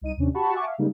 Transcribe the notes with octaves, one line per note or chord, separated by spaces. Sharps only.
C2 D#4 D#7
D#2 C3 C#4 D4
F#4 G4 F#5 A5 B5 C#6
E5 F#5 G#5 A5 C#6 D6
E5 F5
C#3 G3 G#3 A#3 D#4